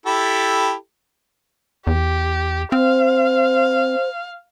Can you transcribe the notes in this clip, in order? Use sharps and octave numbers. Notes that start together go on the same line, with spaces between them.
E4 G4 A4
E2 G4
C4 C5 F5